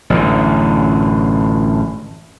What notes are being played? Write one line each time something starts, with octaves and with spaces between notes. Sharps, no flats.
A1 F#2 D3